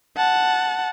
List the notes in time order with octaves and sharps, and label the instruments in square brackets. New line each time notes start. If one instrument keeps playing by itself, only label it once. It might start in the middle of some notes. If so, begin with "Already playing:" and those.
[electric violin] F#5 A5